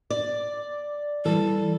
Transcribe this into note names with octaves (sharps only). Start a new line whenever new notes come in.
D5
E3 G3 A4